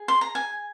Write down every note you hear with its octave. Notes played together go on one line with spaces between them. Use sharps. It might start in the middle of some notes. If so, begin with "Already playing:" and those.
Already playing: G#4
C6
A#5
G#5